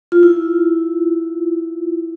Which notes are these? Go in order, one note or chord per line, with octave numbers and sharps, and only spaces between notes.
F4
E4